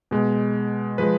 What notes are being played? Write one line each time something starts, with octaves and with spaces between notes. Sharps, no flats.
B2 G#3
F3 G#3 B4